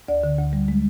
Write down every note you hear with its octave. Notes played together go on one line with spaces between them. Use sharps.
D2 D5
D3
D2
G3
G#3